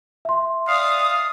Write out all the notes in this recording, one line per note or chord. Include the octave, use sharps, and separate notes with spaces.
E5 C6
D5 F5 D#6